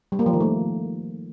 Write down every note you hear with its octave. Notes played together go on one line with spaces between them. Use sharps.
G3
A#3
F3
D#3
A3